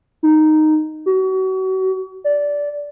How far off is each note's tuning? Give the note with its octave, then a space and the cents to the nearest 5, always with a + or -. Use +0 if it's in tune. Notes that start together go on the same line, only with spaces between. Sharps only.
D#4 -5
F#4 +35
D5 -15